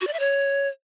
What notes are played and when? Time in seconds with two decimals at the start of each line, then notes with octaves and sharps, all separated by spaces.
0.01 F#4
0.07 D5
0.13 E5
0.19 C#5